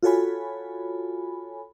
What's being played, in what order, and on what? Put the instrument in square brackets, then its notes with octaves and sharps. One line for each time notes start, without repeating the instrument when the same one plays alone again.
[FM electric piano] F4 F#4 A4 C#5 G#5 B5